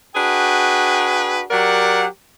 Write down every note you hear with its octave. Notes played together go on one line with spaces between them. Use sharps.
D4 F#4 G#4 B4 G5
F#3 G4 A#4 D5 F#5